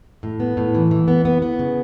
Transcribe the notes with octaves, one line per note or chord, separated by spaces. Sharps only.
A2
B3
A2
E3
E3
B3
B3
B3
C#3